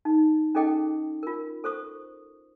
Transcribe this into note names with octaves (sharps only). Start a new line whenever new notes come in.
D#4
C#4 D#4 G#4 A4 D#5 G5
F4 A#4
A4 C5 C#6 D#6